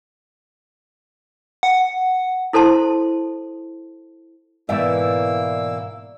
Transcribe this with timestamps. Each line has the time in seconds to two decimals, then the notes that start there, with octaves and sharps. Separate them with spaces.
1.63 F#5
2.53 E4 A4 C5 A5 C6
4.69 G#2 B2 E3 A#3 D5 E5 E6